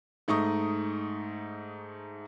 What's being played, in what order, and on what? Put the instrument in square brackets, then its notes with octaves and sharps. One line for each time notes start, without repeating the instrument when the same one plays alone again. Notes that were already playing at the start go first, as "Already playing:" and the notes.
[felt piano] G#2 A3 D#4 C#6 D#6